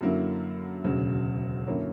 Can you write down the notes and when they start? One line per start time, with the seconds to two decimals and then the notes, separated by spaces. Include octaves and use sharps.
0.01 F#2 D3 F#3 A#3 E4
0.84 E1 D2 C#3 F#3
1.67 F#2 D3 A#3 C#4 E4